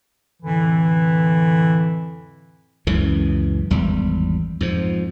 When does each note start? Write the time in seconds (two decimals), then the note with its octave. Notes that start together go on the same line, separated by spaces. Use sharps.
0.43 F2 A2 D3 E3
2.87 C#2 F#2 C#3 E3
3.70 G#1 E2 G3
4.61 F2 G#2 F3